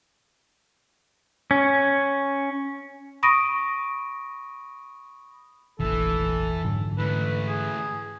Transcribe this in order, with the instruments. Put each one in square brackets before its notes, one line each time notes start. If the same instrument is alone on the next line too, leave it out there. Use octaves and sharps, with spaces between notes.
[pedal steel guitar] C#4
[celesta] B5 C#6 D#6 A#6 D7 D#7
[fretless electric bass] F1 A#1 [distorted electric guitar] E3 [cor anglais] A4
[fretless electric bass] G#2 D3 F#3
[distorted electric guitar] E3 A3 [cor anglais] B4
[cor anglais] G#4